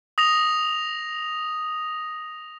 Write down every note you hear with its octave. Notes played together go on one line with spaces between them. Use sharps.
D#6 A#6 F7